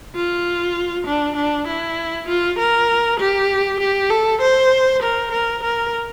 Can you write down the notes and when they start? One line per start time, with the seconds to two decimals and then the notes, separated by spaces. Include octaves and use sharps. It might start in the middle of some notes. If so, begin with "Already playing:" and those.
0.15 F4
1.07 D4
1.36 D4
1.67 E4
2.28 F4
2.59 A#4
3.20 G4
3.80 G4
4.10 A4
4.41 C5
5.03 A#4
5.32 A#4
5.63 A#4